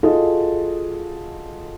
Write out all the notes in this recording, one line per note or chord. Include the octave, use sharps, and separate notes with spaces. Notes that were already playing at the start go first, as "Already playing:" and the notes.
F4 F#4 G#4 A4 D#5